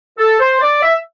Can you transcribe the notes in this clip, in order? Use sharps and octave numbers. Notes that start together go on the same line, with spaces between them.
A4
C5
D5
E5